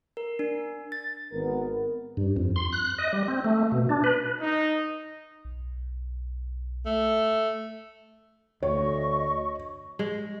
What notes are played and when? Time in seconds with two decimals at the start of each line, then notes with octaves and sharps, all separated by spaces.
0.17 A#4
0.39 D4
0.92 A6
1.32 G#1 B3 A#4
2.17 G2
2.36 F2
2.56 C6
2.72 F#6
2.98 D#5
3.13 G3
3.28 C4
3.45 A3
3.72 B2
3.89 D4
4.04 B4
4.41 D#4
5.45 B1
6.86 A3
8.63 D2 C#5 D#5 C#6
9.99 G#3